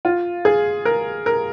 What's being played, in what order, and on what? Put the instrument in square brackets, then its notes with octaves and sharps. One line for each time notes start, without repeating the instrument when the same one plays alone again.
[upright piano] F4
G#4
A#4
A#4